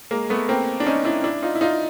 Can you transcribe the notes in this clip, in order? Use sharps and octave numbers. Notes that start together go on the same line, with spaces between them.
G#3 A#3
A3 B3
A#3 C4
D4
C#4 D#4
D4 E4
D4 E4
D#4 F4
E4
D#4 F4